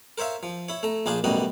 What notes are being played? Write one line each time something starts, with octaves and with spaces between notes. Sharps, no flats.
A#4 C5 C#5 E5 F5
F3
E4 C#5
A3 A#5
A#1 D4 G#4 C5 F5
A1 F#2 B2 G3 F#4 D#5